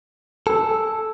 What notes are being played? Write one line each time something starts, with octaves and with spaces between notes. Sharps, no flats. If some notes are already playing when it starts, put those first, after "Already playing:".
A4 G#5 E6